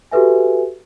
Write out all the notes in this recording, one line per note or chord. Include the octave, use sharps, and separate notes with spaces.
F#4 G4 A4 B4 E5 G#5